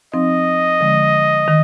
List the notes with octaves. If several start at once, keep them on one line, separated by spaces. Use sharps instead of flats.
F3 C4 D#4 D#5
D3 F3 G#3
D#3